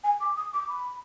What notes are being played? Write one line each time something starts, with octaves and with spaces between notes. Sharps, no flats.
G#5
D6
D#6
D6
B5